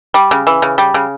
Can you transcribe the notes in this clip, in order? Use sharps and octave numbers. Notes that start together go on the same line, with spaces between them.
G3
C#3
E3
C#3
G3
C#3